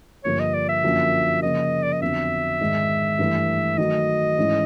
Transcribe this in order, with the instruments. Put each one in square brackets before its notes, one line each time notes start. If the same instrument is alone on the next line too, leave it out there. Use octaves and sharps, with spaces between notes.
[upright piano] G2 D3 F3 A#3 D4 [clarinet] C#5
[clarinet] D#5
D5
E5
[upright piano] F#2 D3 F3 A#3
[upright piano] C#3 F3 A#3 [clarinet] D#5
[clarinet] D5
D#5
[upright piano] F2 D3 F#3 B3 D4 [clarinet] E5
[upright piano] G#2 D#3 G#3
G2 E3 A3
[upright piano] D#3 F#3 A3 [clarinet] D#5
[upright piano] G#2 E3 G#3 C#4 E4